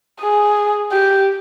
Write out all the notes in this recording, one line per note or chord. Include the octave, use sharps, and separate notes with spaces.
G#4
G4